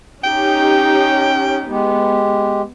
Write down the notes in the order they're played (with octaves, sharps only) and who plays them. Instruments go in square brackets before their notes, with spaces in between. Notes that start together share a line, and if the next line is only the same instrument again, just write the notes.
[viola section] C#4 D#4 G4 [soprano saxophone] G5
[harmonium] G#3 G4 [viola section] B3